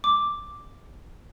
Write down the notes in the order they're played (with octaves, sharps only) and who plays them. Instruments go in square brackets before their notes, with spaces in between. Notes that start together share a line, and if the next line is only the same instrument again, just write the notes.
[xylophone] D6